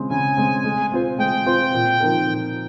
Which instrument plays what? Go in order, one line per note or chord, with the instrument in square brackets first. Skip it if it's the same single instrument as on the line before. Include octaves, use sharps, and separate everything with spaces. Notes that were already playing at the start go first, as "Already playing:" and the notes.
Already playing: [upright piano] C#3 G#3 C4
[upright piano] C#3 [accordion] G#5
[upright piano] G#3 C4
G#3
C4 F4 C5
[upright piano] G#3 [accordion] G5
[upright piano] C4 F4 C5
A#2
F3 C4 D#4 A#4
A#2